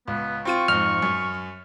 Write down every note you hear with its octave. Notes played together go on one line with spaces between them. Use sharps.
C#2 B3
C4 F4 C#6 D#7
F2 G#2 F6
F#2